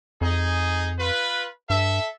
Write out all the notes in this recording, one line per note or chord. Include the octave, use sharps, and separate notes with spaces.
F2 D#4 G#4
F4 B4
G2 A4 E5